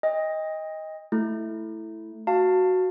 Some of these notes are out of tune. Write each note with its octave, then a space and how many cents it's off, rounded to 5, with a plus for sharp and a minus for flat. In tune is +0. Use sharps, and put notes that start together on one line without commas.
D#5 +15 G5 +40
A3 +0 E4 +0
F#4 +0 F5 +0 A5 +20